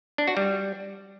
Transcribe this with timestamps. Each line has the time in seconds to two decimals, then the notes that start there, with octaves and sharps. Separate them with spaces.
0.18 D4
0.27 F#4
0.37 G3